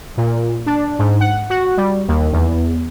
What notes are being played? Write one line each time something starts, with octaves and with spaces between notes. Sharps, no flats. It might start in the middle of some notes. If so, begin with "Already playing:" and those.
A#2
D4
G#2
F#5
F#4
G3
D#2
E2